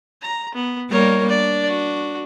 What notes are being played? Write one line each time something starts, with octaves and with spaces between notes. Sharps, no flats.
A#5
B3
G3 A#3 D#4 A#4 C#5
D4 D5
F#4